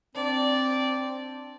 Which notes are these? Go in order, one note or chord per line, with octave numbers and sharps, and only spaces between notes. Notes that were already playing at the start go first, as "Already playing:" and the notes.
C4 D4 D5